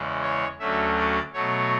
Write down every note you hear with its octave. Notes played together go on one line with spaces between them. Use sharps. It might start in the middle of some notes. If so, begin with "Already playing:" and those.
Already playing: E2 C#3 G#3
C#5
D2 D3 F#3 A3 C#4 E5
D5
B2 F#3 A3 C#5